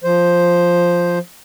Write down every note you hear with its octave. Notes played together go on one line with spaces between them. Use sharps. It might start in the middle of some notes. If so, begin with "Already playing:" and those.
F3 C5